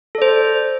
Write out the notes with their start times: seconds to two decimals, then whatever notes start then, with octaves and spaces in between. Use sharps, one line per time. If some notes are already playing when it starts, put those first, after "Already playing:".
0.15 A4
0.18 D5
0.22 C5